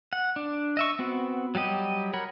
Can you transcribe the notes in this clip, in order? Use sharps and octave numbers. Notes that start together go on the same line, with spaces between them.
F#5
D4
D#5 E5 C#6
B3 C4 F#4
F#3 G3 G4 D#5
A#4 C#5 F#5 B5